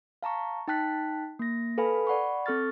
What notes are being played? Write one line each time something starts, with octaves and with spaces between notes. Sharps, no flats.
F5 A5 A#5 C#6
D#4 G5 A5 F#6 B6
A#3 A#6
A4 B4 F5 G#5 B5
D5 F#5 B5 C#6
C4 A4 C#6 F6 A6